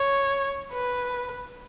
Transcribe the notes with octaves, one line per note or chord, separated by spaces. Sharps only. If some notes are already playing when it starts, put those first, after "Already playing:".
Already playing: C#5
B4